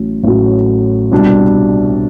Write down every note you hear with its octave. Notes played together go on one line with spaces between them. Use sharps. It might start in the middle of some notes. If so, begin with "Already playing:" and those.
Already playing: A1 A2 F#3
A1 A2 F#3
C2 B2 G3 D4